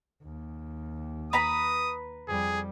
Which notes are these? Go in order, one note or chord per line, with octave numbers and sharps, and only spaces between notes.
D#2
B4 A#5 B5 D#6
F2 G3 G#4